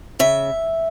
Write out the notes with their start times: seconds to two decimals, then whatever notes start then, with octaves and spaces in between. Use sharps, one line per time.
0.19 C#3 E5